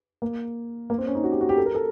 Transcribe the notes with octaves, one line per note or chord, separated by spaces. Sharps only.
A#3
A#3
C4
C#4
D#4
F#4
G4
F#4
G4
A4
A#4
A4